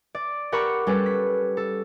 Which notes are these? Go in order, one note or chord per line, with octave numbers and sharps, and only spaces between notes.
D5
G4 A#4 F#5 A5 B5 C#6
G3 C#4 G4 A4 B4
B6
A4